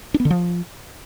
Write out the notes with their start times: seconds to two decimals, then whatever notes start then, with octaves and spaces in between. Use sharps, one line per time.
0.14 D4
0.20 B3
0.25 D3
0.30 F3